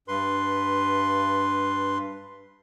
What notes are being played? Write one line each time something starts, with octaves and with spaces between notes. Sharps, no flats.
G2 B4 C6